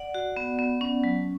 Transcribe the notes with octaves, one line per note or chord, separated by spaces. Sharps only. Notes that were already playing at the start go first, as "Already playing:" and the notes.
Already playing: D5 F#5
F#4
B3
B3
C#4
F#3